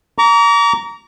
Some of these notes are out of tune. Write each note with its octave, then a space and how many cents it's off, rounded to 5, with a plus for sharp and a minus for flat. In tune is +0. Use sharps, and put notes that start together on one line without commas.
A#5 +0 D6 -45